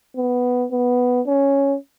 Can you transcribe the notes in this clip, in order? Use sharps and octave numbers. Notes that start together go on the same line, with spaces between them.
B3
B3
C#4